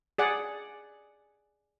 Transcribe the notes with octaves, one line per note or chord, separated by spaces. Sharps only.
G#4 D5 F#5